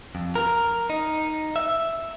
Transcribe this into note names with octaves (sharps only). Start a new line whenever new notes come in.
F2
A#4
D#4
E5